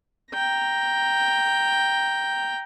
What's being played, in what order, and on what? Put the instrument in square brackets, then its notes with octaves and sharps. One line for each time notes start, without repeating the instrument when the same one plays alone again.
[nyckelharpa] G5 A#5